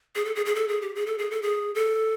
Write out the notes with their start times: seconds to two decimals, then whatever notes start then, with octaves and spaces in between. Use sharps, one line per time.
0.15 G#4
0.25 A4
0.35 G#4
0.46 G#4
0.55 A4
0.68 G#4
0.82 G4
0.95 G#4
1.06 A4
1.18 G#4
1.31 A4
1.42 G#4
1.75 A4